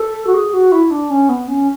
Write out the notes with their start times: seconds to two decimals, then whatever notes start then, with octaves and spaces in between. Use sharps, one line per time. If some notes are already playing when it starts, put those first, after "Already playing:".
Already playing: A4
0.27 F#4
0.34 G#4
0.53 F#4
0.72 E4
0.91 D4
1.10 C#4
1.29 B3
1.48 C#4